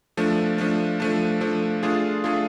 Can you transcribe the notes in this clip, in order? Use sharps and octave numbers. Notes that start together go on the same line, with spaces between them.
F3 A3 D4
F3 A3 D4
F3 A3 D4
F3 A3 D4
A3 D4 F4 G#4
A3 D4 F4 G#4